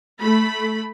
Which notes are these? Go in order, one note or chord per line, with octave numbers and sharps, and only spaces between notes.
A3 B5